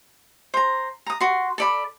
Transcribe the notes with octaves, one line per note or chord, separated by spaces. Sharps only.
C5 A#5
A#5 D#6
F#4 C6
A4 D5 B5